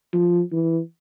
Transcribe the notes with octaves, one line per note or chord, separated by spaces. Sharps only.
F3
E3